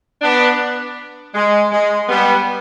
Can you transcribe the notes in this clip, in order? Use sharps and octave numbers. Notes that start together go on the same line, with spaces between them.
B3 D4
G#3
G#3
G3 B3